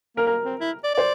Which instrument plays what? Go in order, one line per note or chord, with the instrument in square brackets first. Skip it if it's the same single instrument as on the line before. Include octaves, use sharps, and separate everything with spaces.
[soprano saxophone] A#3 [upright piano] A#4
[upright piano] A#4
[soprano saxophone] C4
E4
D5
[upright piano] C5 [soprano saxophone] D5